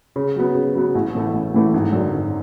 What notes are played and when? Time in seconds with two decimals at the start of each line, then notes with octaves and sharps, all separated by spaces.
0.16 C#3
0.36 F#3 B3
0.55 C#3
0.76 F#3 B3
0.95 A1
1.15 A2 E3 A3
1.33 A1
1.54 A2 E3 A3
1.74 G#1
1.93 F#2 D3
2.12 G#1